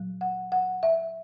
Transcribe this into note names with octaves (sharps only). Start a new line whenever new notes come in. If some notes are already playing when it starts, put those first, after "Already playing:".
Already playing: A#2 F#3
F#5
F#5
E5